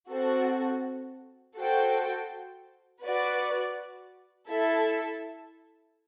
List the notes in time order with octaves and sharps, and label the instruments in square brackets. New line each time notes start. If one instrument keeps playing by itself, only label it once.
[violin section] C4 F#4 A4
F#4 A4 C5 G5
F#4 B4 D5
E4 A4 E5